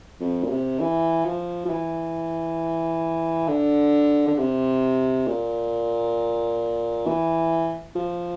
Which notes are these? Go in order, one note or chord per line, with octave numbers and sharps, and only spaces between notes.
F2
A#2
C3
E3
F3
F3
E3
D3
D3
C3
A#2
E3
F3